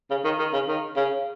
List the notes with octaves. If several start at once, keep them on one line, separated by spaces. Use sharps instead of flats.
C#3
D#3
D#3
C#3
D#3
C#3